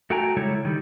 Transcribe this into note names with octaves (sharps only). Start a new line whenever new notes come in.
A3 F#4 A4 G5 G#5 A#5
C#3 G3 G#3 E4 A4 C#5
D#3 G3